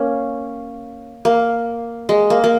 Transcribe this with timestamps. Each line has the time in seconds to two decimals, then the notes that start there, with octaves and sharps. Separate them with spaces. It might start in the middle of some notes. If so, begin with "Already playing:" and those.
Already playing: A#3 C#4
1.25 A#3
2.09 G#3
2.30 A#3
2.44 A#3